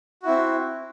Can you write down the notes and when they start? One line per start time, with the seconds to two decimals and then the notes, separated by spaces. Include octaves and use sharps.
0.23 F#4
0.25 E4
0.28 C4